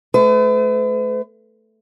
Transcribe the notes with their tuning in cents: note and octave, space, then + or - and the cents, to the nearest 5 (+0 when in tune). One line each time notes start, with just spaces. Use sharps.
A3 -25 B4 +40